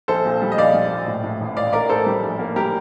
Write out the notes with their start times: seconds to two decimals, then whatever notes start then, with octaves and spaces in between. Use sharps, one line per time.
0.08 A#1 A4 C5
0.25 A#2
0.42 G3
0.52 D#5
0.57 A#1 D5 F5
0.74 G3
0.90 A#2
1.08 A2
1.24 A2
1.41 A1
1.56 A2 D5 F5
1.73 A1 A#4 D5
1.89 A2 A4 C5
2.06 G3
2.22 A#1
2.39 A#3
2.56 G3 G4 A#4